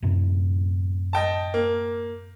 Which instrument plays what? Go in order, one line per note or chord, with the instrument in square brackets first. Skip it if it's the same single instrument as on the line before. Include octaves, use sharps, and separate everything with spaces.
[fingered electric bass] F#2 A2 C3
[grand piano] D#5 G5 A5
A#3